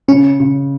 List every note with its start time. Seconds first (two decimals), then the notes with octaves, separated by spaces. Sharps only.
0.08 C#3 C#4
0.40 C#3